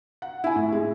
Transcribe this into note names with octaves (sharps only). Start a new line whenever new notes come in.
F#5
E4 G#5
A2
G#3